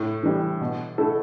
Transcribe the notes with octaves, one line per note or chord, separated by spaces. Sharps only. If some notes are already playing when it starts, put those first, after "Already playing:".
Already playing: A2
E3 G3
B2
A3 E4 A4